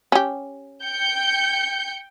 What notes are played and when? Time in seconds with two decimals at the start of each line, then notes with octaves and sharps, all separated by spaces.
0.12 C#4 G4
0.84 G5 G6 C#7